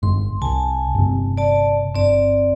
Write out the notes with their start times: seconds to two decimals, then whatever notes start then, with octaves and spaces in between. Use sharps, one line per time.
0.03 G1 G#2 C6
0.42 C2 G#5 A5
0.95 G1 C3
1.38 D5 A5
1.95 G1 C4 D5